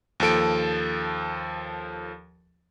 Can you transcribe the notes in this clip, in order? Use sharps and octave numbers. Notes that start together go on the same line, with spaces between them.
D#2 F3 A4 D7